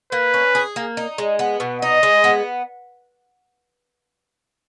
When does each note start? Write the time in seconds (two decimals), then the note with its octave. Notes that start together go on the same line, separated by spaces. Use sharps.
0.12 A#3 B4
0.34 C#4
0.55 G#4
0.76 A#3
0.97 D#4
1.18 G#3
1.39 B3
1.60 B2
1.82 D#4 D#5
2.03 G#3
2.24 B3